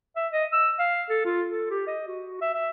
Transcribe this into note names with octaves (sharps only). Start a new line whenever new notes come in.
E5
D#5
E6
F5
A4
F4
A4
G4
D#5
F#4
E5
E5